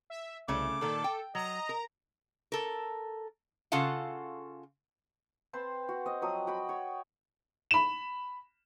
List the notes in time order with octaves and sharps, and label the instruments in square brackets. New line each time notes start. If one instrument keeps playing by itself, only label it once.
[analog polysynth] E5
[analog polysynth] C2 [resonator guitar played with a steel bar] C#3 A3 C#4 [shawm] D6
[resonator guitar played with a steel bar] A#2 D#3 A#3 [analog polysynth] A4
[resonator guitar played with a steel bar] G5
[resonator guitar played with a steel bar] F#3 [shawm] D#5 [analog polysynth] A#5
[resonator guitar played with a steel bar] A#4
A4 A#4
C#3 F4 A4 F5 F#5
[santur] C4 B4 C5 A5
F#4
C4 D#5
F3 F#3 D#6
F#4 G5 B5
C#5
[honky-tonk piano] B5 E7